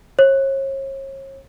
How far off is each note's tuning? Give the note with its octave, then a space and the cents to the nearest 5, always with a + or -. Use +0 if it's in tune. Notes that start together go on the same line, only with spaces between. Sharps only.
C#5 -40